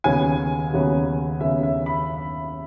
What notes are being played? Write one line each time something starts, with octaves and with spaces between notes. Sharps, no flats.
D#2 C#3 F#3 B3 G#5
D#2 C#3 F#3 B3
D#2 C#3 F#3 B3 E5
E5
B5